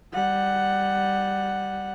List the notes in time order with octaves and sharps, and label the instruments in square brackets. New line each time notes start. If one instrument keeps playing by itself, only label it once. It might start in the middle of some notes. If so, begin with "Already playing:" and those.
[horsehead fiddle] G3 F#5